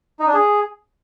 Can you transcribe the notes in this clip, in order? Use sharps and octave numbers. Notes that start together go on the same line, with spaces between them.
D#4
D4
G#4